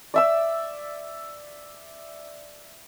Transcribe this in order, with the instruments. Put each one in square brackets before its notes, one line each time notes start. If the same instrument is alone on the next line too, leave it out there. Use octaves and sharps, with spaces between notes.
[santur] D5 E5 E6